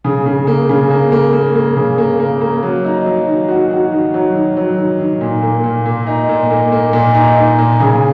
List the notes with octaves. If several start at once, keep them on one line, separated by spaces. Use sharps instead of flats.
C#3
C#3
A#3
C#3
A#3
A#3
A#3
A#3
C#3
A#3
A#3
A#3
F#3
D#4
F#3
D#3
F#4
F#4
D#3
F#3
D#3
F#3
D#3
D#3
A#2
A#3
A#2
A#2
D#4
A#2
A#3
A#3
A#2
D#4
D#4
A#2
C#3